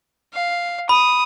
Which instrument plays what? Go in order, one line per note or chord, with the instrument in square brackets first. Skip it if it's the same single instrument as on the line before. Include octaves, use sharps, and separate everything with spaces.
[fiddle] F5
[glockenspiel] B5 [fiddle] D#6